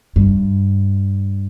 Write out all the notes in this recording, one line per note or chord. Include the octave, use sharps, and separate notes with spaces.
G2